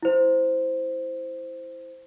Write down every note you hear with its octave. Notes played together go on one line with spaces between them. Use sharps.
E4 C5